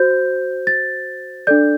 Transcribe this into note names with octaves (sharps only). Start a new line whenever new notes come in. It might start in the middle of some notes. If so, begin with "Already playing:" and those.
Already playing: F#4 C5 G6
A6
D4 A4 D5 G6